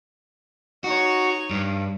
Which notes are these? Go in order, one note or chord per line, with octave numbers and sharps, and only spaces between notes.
D#4 F#4 C#5
G2